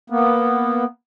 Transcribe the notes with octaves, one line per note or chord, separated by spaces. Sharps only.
A#3 B3